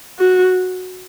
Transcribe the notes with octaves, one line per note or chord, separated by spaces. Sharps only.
F#4